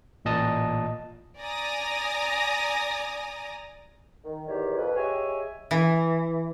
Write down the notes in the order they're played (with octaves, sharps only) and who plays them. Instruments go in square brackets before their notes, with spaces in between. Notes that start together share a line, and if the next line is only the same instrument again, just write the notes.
[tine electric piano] A1 A#2 D#5 A5 D#6
[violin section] D5 G#5 A#5 D#6 A#6
[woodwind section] D#3
E2 G#2 D#3 G4 C#5
F2 B4
G4 G#4 C#5 D#5 E5 G#5
[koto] E3